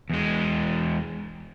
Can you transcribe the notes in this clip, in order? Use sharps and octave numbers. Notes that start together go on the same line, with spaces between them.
E2 G#3